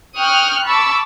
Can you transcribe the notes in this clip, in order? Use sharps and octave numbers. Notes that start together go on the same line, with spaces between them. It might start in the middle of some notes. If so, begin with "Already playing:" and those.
G5 C#6 D#6 F6 F#6
A5 B5 C#6 D6 E6